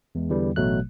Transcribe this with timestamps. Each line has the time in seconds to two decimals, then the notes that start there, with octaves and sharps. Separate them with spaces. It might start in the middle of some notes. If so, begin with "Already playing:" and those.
0.15 E2 G#3
0.30 E2 D3 E3 G3
0.56 A1 B2 F#3 A3 F#6